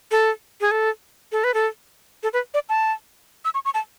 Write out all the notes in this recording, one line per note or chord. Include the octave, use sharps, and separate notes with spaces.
A4
G#4
A4
A4
B4
A4
A4
B4
D5
A5
E6
C#6
C#6
A5